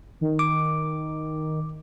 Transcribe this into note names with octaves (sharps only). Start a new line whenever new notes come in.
D#3
D6